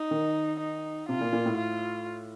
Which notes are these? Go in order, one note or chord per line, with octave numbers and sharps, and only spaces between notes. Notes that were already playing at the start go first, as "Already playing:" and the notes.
Already playing: D#4
D#3
D#4
C3 F4
A#2
A#2
A2
F4